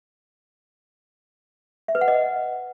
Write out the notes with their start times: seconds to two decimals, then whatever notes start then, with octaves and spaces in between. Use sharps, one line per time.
1.88 E5
1.95 B4
2.01 F#5
2.08 D#5